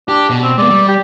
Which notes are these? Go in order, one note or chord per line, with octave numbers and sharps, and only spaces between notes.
D4 G4
B2
C4
G#3 B3 D5
G3
G4